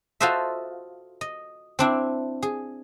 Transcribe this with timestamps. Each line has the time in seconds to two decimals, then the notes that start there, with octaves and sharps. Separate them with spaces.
0.20 F4 F#4 A4 C5 D#5 E5
1.21 D#5
1.79 C4 D4 E4
2.42 G#4